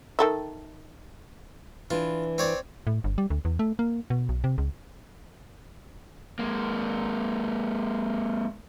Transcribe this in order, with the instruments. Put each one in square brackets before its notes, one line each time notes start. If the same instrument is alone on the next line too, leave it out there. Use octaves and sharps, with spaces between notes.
[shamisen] D#3 A4 E5
[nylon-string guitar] E3 D4 [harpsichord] F4
[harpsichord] C4 C#5 D5
[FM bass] A2
G1
G3
D2
E2
A3
A#3
B2
B1
C3
C#2
[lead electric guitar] G#3 A#3